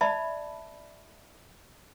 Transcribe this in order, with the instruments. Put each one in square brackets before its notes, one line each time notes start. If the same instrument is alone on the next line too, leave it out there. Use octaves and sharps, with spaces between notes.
[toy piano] D5 E5 A5 B5